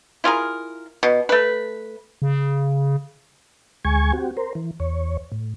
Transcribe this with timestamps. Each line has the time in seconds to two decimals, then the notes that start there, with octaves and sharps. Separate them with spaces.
0.24 E4 F4 G#4 A#4
1.03 B2
1.29 A3 B4
2.22 C#3
3.85 D2 G#3 G#5 C#6 G#6
4.13 C4 F#4 G4
4.37 A#4 C5
4.55 E3
4.80 E2 C#5
5.32 A2